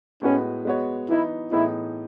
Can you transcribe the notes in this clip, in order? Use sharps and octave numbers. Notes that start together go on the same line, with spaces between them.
A2 G#3 B3 C#4 F#4 B4
G#3 B3 F#4 C#5
E3 B3 D#4 E4
A2 E3 B3 D#4 E4 G#4